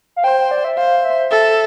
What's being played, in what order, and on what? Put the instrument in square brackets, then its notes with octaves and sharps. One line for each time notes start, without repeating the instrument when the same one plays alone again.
[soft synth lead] F5
[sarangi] C5 [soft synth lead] G5
[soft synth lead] D5
E5
[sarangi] C5 [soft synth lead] F5
[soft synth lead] E5
[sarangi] A4 [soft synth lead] E5